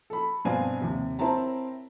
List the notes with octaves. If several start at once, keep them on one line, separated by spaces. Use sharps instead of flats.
A4 B5
G2 B2 C4 D4 F5 G#5
D#2 C3
C4 E4 A#4 C#5 A5 A#5